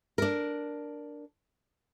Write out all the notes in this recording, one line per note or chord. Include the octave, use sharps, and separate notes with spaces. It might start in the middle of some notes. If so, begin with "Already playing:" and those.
D4 A#4